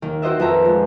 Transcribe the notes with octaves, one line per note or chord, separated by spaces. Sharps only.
D#2 D#3
E4 F#4 C5 D#5 E5
F2 D#3 B4 E5 A#5
F3 G#3